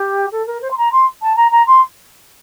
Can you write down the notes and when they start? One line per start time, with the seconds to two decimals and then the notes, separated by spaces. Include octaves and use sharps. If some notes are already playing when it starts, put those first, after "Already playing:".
Already playing: G4
0.32 A4
0.46 A#4
0.62 C5
0.71 C6
0.77 A#5
0.92 C6
1.22 A5
1.36 A#5
1.51 A#5
1.67 C6